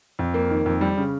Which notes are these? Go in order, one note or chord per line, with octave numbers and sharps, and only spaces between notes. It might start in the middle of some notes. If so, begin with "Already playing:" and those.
F2
A#3
D#3
F2
G3
C#3